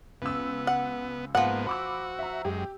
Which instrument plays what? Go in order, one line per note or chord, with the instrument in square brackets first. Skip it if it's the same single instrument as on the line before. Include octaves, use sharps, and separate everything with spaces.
[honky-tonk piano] C#2 E6 [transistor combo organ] B3
[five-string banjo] F#5
[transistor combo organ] G#2 A#3 B3 [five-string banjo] F3 F#5
[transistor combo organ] F#4 [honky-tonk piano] B5 D6 E6
[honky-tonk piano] E5 A#5
[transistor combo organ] F#2 G#3 [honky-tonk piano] G4